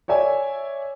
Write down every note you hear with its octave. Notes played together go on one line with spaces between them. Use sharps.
C#5 D5 E5 G#5